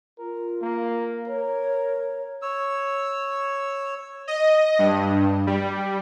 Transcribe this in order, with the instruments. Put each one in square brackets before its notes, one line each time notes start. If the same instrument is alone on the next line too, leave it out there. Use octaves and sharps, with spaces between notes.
[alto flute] F4 [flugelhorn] A#4
[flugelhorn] A#3
[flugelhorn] A#4 [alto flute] C#5
[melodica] C#5 E6
[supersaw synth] D#5
G2
G3